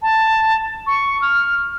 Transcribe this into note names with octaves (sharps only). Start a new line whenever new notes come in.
A5
C#6
F6